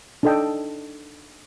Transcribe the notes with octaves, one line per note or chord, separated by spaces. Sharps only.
D4 D#4 A4 D#5 G5